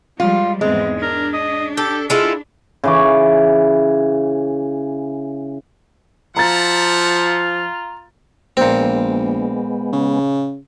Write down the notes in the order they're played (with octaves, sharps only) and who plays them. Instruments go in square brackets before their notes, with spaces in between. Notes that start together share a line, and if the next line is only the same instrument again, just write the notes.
[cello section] F3 G3 G#3 [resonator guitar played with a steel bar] F4
[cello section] E2 G#2 C4 [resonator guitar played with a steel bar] G#3
[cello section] D4 [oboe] A#4
[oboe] D#5
[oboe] G4 [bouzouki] A4
[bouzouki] G#3 E4 F4 [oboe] A4
[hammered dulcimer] C#3 E3 D6
[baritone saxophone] F3 [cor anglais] F4 [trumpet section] F#4 E5 F#5 [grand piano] A#5 A6
[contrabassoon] A#1 [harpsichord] A#2 C4 [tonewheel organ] G#3 B3
[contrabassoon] C#3